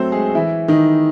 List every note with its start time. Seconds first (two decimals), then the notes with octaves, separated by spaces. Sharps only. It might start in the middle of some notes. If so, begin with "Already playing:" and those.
Already playing: F#3 A3 C4 F#4 A4 C5
0.12 G#3 G#4
0.35 E3 E4
0.68 D#3 D#4